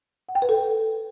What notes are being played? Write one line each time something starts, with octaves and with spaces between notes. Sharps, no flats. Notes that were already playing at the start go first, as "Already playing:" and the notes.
F#5
G5
B4
A4